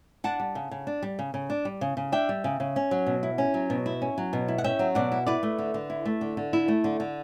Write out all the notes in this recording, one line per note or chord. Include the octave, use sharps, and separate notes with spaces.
D4 F#5 A5
G3
C#3
C#3
D4
G3
C#3
C#3
D4
G3
C#3
C#3
D4 E5 G5
G3
C#3
C#3
C#4
F#3
B2
E4
C#4
F#3
B2
E4
C#4
F#3
B2
E4
F#5
C#4 E5 G5
F#3
B2 D5 F#5
E4
E4 B4 D5
A3
D3
D3
E4
A3
D3
D3
E4
A3
D3
D3